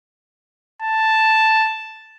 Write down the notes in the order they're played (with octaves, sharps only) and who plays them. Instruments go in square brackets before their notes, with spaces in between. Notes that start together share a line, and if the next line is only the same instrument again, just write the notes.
[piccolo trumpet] A5